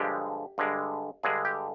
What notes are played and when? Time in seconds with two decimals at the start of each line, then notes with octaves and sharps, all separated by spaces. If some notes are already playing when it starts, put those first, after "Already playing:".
Already playing: G2 D3 F3 G#3 G4
0.58 G2 D3 G#3
1.23 G2 D3 G#3 G#4
1.45 G4